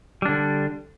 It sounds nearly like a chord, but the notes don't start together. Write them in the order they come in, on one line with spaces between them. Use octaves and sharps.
G3 D4 D3